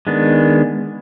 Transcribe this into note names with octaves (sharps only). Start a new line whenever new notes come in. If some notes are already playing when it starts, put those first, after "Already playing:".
D#3 G#3 B3 D4